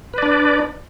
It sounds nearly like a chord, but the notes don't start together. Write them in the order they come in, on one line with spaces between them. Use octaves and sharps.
B4 D5 D4